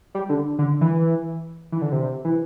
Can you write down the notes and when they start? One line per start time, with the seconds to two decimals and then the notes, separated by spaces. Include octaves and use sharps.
0.15 G3
0.29 D3
0.59 D3
0.81 E3
1.72 E3
1.82 D3
1.92 C3
2.25 E3